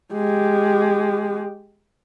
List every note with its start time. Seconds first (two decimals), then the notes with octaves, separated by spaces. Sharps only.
0.12 G#3 G4